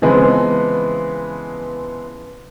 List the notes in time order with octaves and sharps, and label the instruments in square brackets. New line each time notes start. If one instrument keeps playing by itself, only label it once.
[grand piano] C#3 E3 F3 G#3 B3 C4